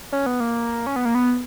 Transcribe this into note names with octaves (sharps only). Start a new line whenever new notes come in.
C#4
B3
A#3
C#4
B3
A#3
B3